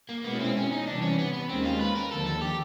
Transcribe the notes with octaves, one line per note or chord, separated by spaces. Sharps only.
A#3
B2 G#3 B3 C#4 E4
C4
C#4
D#4
C3 E3 G3 D4
C#4
B3
B3
D#2 D#3 G#3 C4 C#4
F4
B4
A#4
D#2 D3 F3 A4
A4
G4